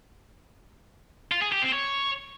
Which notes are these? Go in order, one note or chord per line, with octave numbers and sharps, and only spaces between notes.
F4
G#4
G4
C4
C#5